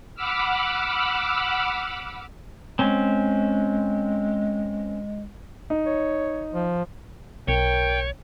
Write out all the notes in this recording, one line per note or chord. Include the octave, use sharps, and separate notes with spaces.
F#5 B5 D6 E6 F6
G#3 C4 C#4
D#4
C#5
F3
B1 A#4 C#5 G5